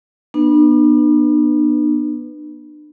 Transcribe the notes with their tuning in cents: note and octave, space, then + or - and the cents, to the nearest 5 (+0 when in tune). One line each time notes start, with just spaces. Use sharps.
B3 -25 D4 +40 B4 +0